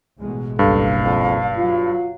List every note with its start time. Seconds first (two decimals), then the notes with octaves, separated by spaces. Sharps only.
0.19 A1 B2 G#3
0.59 F#1 B1 G2 A4 F5
1.04 F2
1.57 F#3 F4